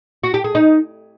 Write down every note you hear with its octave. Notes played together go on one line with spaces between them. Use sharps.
F#4
G4
G#4
D#4